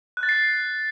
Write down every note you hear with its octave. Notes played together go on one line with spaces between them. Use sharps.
F#6
A6
C7